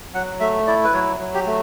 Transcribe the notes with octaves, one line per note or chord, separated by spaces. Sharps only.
F#3 F#5
A3 E5
E4 D5
B4
F#3 C#5
F#3
G4
A3